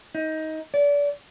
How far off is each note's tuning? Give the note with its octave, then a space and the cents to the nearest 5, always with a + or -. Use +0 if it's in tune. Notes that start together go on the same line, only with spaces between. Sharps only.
D#4 +20
D5 -30